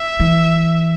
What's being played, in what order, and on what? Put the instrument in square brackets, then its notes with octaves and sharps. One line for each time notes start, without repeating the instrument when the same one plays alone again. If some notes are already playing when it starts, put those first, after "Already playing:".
Already playing: [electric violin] E5
[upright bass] E3